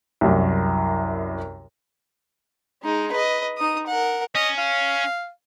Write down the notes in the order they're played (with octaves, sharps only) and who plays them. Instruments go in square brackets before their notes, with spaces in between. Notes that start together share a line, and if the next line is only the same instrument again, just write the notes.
[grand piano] C2 F#2
[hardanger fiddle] G#3 D#4
B4 D#5
D#4 D#6
A#4 F#5
[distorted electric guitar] C#4 [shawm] D#5
[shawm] F5